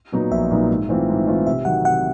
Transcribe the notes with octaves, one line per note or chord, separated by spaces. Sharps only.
A#2 F#3 B3 D#4
A#1 E5
A#2 F#3 B3 D#4
G#2
E3 A3 C4 F4
G#2
E3 A3 C4 F4
C3 E5
D#3 F#3 F#5
C3 F#5